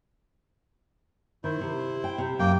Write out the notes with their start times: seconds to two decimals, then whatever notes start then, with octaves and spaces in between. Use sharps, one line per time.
1.44 D#3 E4 C5
1.61 C3
2.04 G5
2.18 C3
2.39 F#2 A#3 G5